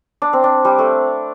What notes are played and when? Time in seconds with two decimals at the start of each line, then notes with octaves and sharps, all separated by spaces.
0.22 D4
0.33 C4
0.44 D4
0.65 G3
0.79 A3